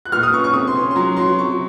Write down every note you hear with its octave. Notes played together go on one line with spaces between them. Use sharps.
F#6
A#2 F6
D#6
C#4 C#6
C#6
C3 D#6
C6
C#4
C6
F#3 A#5
F#3 C6
C3 C#6